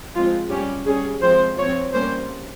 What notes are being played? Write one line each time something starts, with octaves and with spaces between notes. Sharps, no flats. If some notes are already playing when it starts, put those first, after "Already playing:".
F3 G#3 C4 F4
G3 C#4 G4
G3 C#4 G#4
F3 G#3 C4 C5
F3 C4 C#5
G3 A#3 C#4 C5